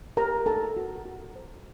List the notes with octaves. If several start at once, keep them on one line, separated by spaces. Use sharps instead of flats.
G4 A#4 C5 A#5
D#4 A4 A5
F#4 A#4
F#4
C5